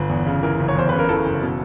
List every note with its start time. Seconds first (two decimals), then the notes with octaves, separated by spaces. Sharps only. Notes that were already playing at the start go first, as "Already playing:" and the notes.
Already playing: G1 B4
0.10 E2
0.26 C#3
0.43 E3 A#4
0.59 F#1
0.68 C#5
0.76 E2 C5
0.89 C#3 B4
0.99 A#4
1.09 E3 A4
1.26 F#1
1.43 B2